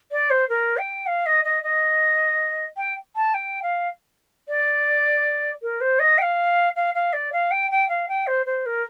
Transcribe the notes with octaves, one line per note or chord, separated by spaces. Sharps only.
D5
C5
A#4
G5
F5
D#5
D#5
D#5
G5
A5
G5
F5
D5
A#4
C5
D#5
G5
F5
F5
F5
D5
F5
G5
G5
F5
G5
C5
C5
A#4